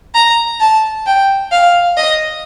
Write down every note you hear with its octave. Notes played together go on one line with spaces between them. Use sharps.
A#5
A5
G5
F5
D#5